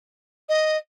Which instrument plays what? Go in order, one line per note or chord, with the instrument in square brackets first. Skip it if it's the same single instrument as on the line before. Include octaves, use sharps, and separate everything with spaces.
[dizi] D#5